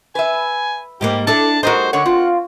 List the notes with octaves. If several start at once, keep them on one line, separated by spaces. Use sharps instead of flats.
B4 E5 G#5
G#2 G3 A#3 G4
D4 E4 A4 A5
G3 D#4 F#4 A#4 C5 D#5
D3 C#5 F#5
C4 F4